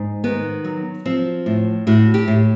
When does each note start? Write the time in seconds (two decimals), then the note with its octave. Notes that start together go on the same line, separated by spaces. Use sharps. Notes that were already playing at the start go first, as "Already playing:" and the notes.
Already playing: G#2
0.24 D#3 B3
0.65 F#3
1.05 F3 C4
1.46 A2
1.87 A2 F#4
2.14 G4
2.28 A2